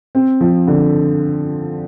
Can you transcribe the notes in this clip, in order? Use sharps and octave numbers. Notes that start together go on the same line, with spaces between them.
C4
F3
D3